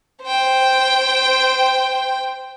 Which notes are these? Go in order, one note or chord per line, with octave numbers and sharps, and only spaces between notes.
C5 G5